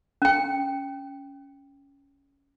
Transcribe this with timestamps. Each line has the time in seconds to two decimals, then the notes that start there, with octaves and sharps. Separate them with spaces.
0.22 C#4 G5